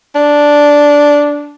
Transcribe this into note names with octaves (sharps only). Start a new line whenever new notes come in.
D4